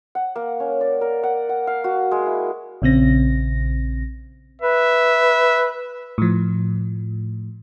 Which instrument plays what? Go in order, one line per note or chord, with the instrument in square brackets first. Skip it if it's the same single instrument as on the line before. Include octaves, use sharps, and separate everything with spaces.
[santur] F#5
A#3
C#4
D5
A#4
F#5
F#5
F5
F#4
G#3
E4
[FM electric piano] A#1 C#3 C4 A#6
[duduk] B4 [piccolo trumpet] E5
[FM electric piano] A2 F3